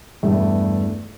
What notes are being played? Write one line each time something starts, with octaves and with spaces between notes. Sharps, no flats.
E2 G2 A3